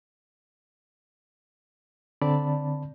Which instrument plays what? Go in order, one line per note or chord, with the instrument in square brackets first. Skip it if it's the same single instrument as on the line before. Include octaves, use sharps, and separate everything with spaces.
[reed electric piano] D3 C4 D5 A5 B5